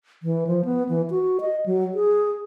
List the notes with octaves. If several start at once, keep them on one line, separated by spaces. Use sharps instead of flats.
E3
F3
B3
E3
F#4
D#5
F#3
G#4